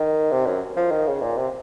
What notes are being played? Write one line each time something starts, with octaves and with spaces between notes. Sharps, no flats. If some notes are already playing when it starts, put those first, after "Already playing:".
Already playing: D#3
C3
F#2
F3
D#3
C#3
A#2
C3